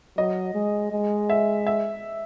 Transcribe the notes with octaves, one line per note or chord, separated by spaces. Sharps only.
F#3 D#5
G#3
G#3
E5
E5